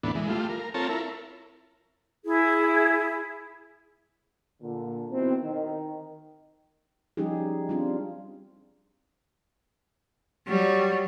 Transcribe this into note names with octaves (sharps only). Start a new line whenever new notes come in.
D#2 A2 E3 B3 D4
E3 G#3
G3 A3 F4
A#4
C4 F4 A4 C#5 A5 A#5
E4 A#4
E4 G#4
A#2 D3
B2 D#3 E3 C4
D#3
F3 G3 C#4 D#4 G4 G#4
G3 C4 D4 F4
F#3 G3